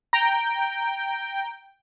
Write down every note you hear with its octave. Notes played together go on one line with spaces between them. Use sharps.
G5 A#5